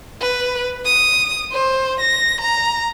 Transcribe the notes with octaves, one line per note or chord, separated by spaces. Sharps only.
B4
D#6
C5
A#6
A#5